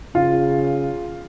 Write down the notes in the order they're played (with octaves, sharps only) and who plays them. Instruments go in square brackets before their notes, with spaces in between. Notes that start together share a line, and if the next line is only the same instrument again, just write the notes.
[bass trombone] C#3 [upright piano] F4